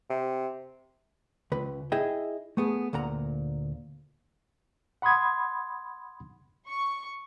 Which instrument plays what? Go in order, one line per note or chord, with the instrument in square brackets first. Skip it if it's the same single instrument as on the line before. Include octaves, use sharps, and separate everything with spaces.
[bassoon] C3
[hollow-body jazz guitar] C#2 B4
E4 G#4 D#5 G5
A3 B3 G#4
D2 A#2 F#5 A#5
[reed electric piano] F#5 B5 C6 D#6 G#6
[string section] C#6